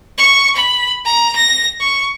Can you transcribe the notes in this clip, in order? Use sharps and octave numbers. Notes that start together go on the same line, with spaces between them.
C#6
B5
A#5
A#6
C#6